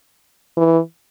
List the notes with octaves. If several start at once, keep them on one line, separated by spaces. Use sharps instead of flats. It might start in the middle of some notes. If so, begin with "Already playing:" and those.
E3